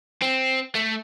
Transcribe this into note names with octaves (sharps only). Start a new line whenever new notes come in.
C4
A3